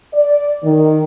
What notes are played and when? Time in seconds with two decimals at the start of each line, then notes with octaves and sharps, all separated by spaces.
0.14 D5
0.63 D#3